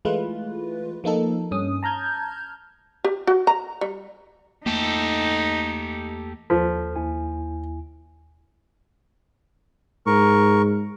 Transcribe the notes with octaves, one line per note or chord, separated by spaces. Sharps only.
E3 G#3 A3 F4 B4
F3 A#3 D#4 A4
G2 C#4 D#6
A5 A#5 F6 G6 G#6
G4
F#4
A#5
G3
E2 A3 A#3 D#4 G4 A4
D#2 F3 A4 B6
D#2 E4 G#5
G#2 A#4 C#6